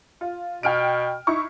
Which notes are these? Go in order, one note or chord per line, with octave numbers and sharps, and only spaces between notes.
F4
B2 G5 F6 D7
D#4 E4 C#6